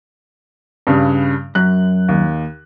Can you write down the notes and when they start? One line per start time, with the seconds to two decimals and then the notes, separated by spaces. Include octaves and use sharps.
0.87 G2 C#3 G3
1.55 F#2 F#6
2.08 D#2